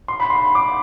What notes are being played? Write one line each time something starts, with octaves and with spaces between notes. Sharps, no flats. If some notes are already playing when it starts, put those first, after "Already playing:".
C6
B5
C6
D6